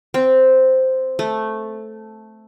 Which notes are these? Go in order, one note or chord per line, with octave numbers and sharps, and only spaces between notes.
C4
A3